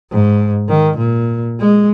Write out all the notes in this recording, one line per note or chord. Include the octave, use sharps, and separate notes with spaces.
G#2
D#3
A#2
G#3